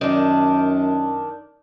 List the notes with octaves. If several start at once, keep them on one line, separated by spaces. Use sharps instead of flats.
F#2 D#3 D4